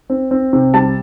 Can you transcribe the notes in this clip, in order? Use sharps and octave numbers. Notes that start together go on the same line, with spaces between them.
C4
C4
C3
G3 A5